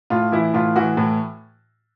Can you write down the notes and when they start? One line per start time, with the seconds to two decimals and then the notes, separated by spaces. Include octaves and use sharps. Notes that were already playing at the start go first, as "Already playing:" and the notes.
0.10 A2 F4
0.32 E3 E4
0.54 A2 F4
0.76 E3 F#4
0.97 A2